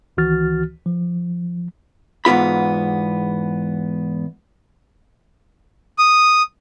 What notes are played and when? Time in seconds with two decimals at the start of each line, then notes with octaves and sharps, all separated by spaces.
0.17 C#2 D#3 E3 F#4 F6 A6
0.86 F3
2.25 E2 G#2 B3 F4 B5
5.98 D#6